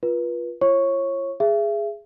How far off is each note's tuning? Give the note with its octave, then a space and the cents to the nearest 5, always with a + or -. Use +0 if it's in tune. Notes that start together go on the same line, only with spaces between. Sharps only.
F4 +0 B4 -30
F4 -40 C#5 -25 C#6 +0
G#4 -5 E5 +35